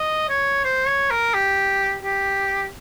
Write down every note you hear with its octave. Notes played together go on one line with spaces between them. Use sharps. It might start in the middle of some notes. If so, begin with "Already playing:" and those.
Already playing: D#5
C#5
C5
C#5
A#4
G4
G4